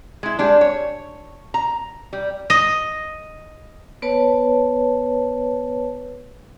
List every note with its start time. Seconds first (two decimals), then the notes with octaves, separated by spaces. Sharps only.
0.23 G#3 E4
0.39 G3 G#3 D4
0.61 C#5
1.54 A#5
2.13 G3
2.50 D#5
4.02 B3 B4 C#5 A5